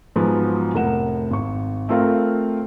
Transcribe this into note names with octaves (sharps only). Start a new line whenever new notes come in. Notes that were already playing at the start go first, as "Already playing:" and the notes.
G#2 F3 F#3 G#3 B3 F#4
F1 A2 A#4 F#5 E7
G#1 C#6
A3 C4 F4 A4 A#4 F5